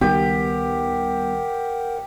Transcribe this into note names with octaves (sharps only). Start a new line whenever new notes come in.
C#2 D#3 G3 B3 G4 A#4 F#5